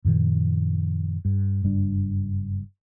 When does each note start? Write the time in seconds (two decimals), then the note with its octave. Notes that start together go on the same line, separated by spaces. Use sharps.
0.05 F#2 A#2 D#3 F3
1.25 G2
1.63 F#1 G2 G3 D4